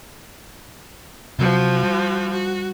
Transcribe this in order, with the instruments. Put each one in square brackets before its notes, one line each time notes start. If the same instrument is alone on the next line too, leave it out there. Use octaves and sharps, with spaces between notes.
[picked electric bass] C3 F#3 [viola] F3 F#4
[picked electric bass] G3
[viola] F#4